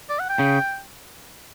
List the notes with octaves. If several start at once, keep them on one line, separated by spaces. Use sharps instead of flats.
D5
F#5
G5
C#3